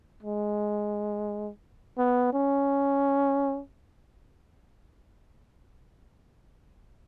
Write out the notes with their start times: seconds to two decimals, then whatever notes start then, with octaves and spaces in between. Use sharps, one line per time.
0.23 G#3
1.98 B3
2.33 C#4